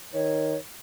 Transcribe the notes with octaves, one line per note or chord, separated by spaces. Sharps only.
D#3 C#5